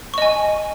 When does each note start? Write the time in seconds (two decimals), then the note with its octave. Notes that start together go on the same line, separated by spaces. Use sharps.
0.14 C#6
0.18 D#5
0.22 G#5